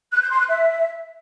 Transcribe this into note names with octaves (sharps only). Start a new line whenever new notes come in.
F#6
G6
C6
F#6
E5